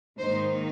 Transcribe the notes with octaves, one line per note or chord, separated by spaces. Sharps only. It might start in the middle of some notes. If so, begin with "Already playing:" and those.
G#2 D#3 A#3 D#4 C5